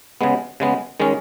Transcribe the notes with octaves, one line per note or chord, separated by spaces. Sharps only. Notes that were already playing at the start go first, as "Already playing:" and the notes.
C#3 G#3 B3
C#3 G#3 B3
D#3 G#3 C#4